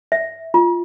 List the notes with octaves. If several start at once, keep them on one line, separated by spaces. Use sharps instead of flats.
E5
F4